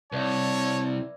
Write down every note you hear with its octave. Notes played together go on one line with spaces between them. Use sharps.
C2 B4 C#5 D5 E5 A5